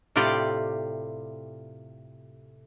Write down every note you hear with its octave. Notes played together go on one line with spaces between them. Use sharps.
A2 C3 F4 G4 D5